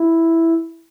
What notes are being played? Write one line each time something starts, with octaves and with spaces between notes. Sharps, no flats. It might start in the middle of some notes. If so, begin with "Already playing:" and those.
Already playing: E4